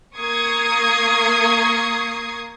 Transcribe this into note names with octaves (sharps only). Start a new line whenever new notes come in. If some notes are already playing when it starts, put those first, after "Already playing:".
A#3 C#6 D#6 G#6 C7